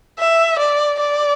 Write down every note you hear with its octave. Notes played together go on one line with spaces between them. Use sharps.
E5
D5
D5